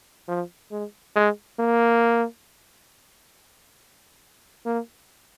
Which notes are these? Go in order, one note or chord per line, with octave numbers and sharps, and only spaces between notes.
F3
G#3
G#3
A#3
A#3